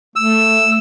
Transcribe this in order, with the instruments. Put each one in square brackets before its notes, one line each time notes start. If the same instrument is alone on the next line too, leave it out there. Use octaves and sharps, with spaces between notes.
[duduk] A3 [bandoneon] E6